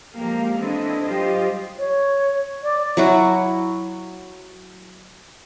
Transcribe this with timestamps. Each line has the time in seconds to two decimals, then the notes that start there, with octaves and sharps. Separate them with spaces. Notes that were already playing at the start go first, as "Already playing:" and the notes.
0.15 F3 G#3 A#3 G4 A#4 F5
0.57 E3 C4 D4 E4 A4 D#5
1.03 F#3 G3 F4 G4 C5 D#5
1.78 C#5
2.62 D5
2.97 F#3 E4 F#4